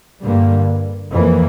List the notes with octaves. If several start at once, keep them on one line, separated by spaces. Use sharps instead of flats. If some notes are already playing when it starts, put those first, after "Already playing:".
G2 D3 G3 A#3
F2 E3 A#3